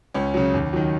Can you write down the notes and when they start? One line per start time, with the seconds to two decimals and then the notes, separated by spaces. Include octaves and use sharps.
0.14 C#2 C#4
0.34 C#3 F#3
0.54 D#2
0.73 D#3 F#3